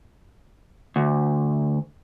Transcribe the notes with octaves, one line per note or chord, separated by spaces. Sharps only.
D2